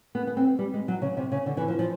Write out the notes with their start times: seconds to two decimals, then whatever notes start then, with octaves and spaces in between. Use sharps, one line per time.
0.15 B3
0.27 B3
0.37 C4
0.59 G3
0.74 G#3
0.88 F#3
1.02 C#3
1.17 C3
1.32 C#3
1.46 D3
1.57 E3
1.68 F3
1.79 F3